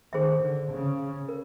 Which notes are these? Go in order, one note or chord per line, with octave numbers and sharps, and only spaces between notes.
D#3 G#4 C5 E5
D3
C#3
A#4